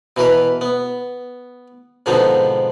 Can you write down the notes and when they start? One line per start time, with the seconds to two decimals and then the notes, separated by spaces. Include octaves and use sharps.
0.17 B2 E3 A#4 B4
0.61 B3
2.06 G#2 B2 D3 F3 B3 C4